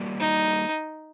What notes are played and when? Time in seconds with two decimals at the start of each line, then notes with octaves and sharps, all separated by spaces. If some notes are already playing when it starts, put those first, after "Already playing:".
Already playing: G3 A#3 F#4 A#4 D5
0.20 D#4